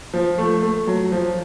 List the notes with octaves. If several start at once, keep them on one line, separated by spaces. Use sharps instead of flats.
F3
A3
A3
F#3
F3